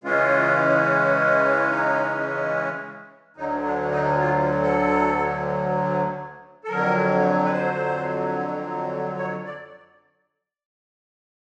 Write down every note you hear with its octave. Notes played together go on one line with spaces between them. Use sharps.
C#3 E3 G#3 C#4 F4
D#4
D2 D3 F#3 D#4
D4
D#4
F4
A4
A4
F2 D3 F#3 A#4
B4
C5
C#5
D5